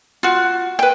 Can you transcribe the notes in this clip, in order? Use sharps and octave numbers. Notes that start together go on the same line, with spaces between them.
F4 F#4
B4 G5